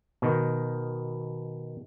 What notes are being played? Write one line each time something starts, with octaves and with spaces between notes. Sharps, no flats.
B2 D#3